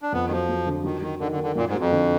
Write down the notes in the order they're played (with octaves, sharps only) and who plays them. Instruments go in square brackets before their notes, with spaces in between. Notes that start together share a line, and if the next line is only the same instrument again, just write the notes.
[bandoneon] D4
[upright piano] F2 [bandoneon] B3
[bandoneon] D#3
[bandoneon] F3 [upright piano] F#3
[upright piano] F#3
D3
[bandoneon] D#3 [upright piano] F#3
[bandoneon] D#3 [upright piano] F#3
[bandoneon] D3 [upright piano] D#3
[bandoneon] D3
[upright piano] D#3
[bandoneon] D3
[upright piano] F#2 [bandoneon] A#2
[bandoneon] G#2
[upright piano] F#3
[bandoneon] F2
[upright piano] D3